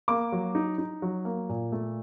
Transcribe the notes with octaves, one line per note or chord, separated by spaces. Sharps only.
A#3 D6
F#3
D#4
D#4
F#3
A#3
A#2
A3